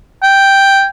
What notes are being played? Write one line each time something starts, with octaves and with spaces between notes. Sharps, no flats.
G5